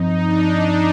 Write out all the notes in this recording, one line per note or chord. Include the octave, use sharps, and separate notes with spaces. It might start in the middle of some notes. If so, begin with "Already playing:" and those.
Already playing: G2 F3 C4 D#4
D4